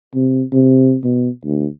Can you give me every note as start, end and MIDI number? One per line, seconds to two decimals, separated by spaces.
0.15 0.42 48
0.53 0.97 48
1.04 1.29 47
1.45 1.67 38